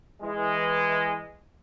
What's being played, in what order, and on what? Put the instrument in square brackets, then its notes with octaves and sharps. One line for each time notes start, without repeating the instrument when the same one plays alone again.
[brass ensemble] E3 G#3